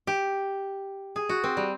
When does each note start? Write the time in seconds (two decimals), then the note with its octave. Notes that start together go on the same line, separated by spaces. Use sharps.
0.07 G4
1.16 G#4
1.29 F#4
1.44 C4
1.57 G3